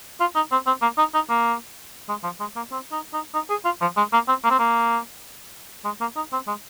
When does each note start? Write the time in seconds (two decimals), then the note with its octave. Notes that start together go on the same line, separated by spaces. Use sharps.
0.20 F4
0.36 D#4
0.52 C4
0.66 C4
0.82 A#3
0.98 D#4
1.14 D#4
1.30 A#3
2.09 G#3
2.23 F3
2.40 G#3
2.56 A#3
2.72 C4
2.92 D#4
3.13 D#4
3.34 D#4
3.50 G#4
3.65 F4
3.81 F3
3.97 G#3
4.13 A#3
4.28 C4
4.44 A#3
4.51 C4
4.59 A#3
5.85 G#3
6.01 A#3
6.16 D#4
6.33 C4
6.47 G#3